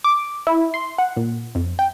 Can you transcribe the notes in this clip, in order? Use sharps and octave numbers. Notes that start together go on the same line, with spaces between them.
D6
E4
C6
F#5
A#2
F2
G5